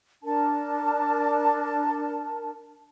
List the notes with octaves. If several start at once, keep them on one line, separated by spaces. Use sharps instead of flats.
D4 A#4 A5